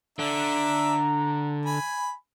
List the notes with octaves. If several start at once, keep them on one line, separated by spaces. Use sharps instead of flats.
D3 D4 E5 A#5
G#5 B5